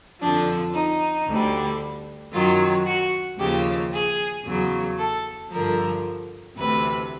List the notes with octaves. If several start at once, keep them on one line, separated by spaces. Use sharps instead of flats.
F2 D3 F3 D4
D#4
D2 D3 G3
F#2 D#3 F#3 F4
F#4
D#2 C#3 F3 G4
G#4
E2 C#3 F#3
A4
G2 D3 F3 A#4
D2 C3 E3 B4